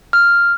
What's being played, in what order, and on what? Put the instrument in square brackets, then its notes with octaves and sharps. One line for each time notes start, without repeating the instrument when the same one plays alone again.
[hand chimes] F6